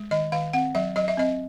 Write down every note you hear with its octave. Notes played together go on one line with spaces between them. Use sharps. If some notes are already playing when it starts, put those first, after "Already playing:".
Already playing: G#3
D#3 D#5
D#3 F5
C4 F#5
F#3 E5
F#3 D#5
E5
C4 D#5